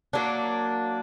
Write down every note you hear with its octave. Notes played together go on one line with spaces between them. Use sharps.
F#3 A#3 D4